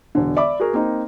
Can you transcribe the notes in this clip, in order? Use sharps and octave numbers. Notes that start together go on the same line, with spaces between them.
E1 D3
D5 E5 B5 D6
F#4 G#4 A#4
A#3 C4 D#4